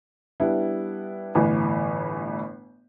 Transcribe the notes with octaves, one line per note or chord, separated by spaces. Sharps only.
G3 B3 D4 E4
G1 A2 E3 B4 G#5